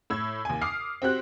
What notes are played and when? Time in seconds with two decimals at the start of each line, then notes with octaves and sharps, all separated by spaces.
0.10 A2 E6 G#6
0.45 D#2 G#5
0.62 D6 D#6 F6 C7
1.02 C4 F#4 G4 F#6